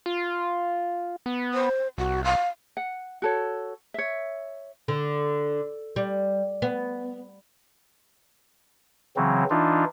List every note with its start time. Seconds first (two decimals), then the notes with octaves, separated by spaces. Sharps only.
0.06 F4
1.26 B3
1.54 C5
1.98 C2 F#4
2.24 F5
2.77 F#5
3.22 F#4 A4 C#5
3.94 C#5 E5
4.88 D3
5.96 G3
6.62 B3
9.16 C#3 E3 F#3 C4
9.50 E3 D4 D#4 F4